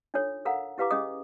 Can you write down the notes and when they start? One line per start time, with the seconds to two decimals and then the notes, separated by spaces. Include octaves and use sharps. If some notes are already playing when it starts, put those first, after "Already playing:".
0.14 D4 D#4 F4 A4 C#5
0.45 A4 A#4 F5 F#5 A#5
0.78 E4 G4 B4 F5 A#5 D6
0.91 C#4 G#4 D#5 D#6